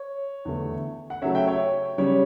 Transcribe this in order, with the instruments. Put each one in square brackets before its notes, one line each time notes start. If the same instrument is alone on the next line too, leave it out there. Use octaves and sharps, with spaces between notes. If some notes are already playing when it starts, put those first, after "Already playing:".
Already playing: [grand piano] C#5
E2 D3 A3
F#5
C#3 F#3 A3 C#5 E5
E5 G5
C#5
C#3 G3 C#4 C#5